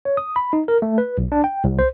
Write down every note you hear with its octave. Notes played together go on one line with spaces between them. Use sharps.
C#5
D#6
B5
D#4
A#4
A3
B4
B1
D4
G5
C2
C5